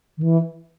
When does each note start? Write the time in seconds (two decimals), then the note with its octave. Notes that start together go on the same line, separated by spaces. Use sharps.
0.18 D#3
0.23 E3